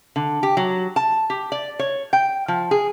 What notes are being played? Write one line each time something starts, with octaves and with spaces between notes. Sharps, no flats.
D3
G4
F#3
A5
G4
D5
C#5
G5
F3
G#4